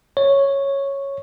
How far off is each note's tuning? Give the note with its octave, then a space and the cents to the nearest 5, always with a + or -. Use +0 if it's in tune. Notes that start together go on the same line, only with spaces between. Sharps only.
C#5 -5